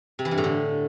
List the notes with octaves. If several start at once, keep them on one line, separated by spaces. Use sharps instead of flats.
C3
E3
G2
A2
D3